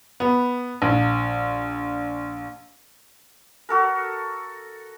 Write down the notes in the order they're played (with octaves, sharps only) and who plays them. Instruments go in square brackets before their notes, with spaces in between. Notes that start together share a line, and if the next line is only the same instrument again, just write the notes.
[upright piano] B3
A#1
[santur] F#4 A4 A#4